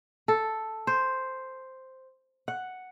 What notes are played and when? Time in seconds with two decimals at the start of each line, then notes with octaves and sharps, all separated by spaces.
0.28 A4
0.87 C5
2.48 F#5